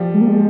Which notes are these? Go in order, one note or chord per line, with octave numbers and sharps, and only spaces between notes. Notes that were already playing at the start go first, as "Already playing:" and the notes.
Already playing: F3 G3
G#3
A#3
G#3